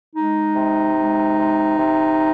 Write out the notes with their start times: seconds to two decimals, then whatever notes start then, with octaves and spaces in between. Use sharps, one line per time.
0.15 G#3 D#4
0.56 C3
0.96 G#3
1.38 C3
1.78 C3